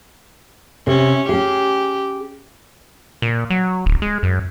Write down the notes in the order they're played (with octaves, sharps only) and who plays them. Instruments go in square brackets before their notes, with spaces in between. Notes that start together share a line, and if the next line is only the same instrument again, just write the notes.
[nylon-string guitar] C3 [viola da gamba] C#4
[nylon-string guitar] C#4 G#4 [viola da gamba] G4
[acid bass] A#2
F#3
D1
G#3
F#2